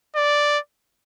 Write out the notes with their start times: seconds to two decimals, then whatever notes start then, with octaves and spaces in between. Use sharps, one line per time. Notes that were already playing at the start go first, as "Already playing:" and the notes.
0.16 D5